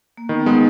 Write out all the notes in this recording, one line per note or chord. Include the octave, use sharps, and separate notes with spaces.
A#3
D#3 B3
C#4
G#3 B3 D#4